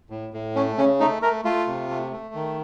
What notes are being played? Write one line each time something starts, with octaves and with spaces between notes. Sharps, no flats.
A2
A2
A3 C#4
C#3 C#4
A3 D#4
A3 A#4
A3 F4
C3
A3
A3
D#3